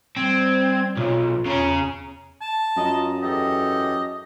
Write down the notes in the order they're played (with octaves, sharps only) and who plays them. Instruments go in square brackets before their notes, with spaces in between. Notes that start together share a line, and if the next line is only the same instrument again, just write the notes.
[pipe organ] G3 G#6 [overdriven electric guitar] C4
[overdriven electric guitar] B1 [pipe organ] F4
[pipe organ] E2 A#5 [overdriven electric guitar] C#3 C#4
[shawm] A5
[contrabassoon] F#2 [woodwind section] F4 D#5 A#5
[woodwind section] E2 G4 A4 [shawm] D#5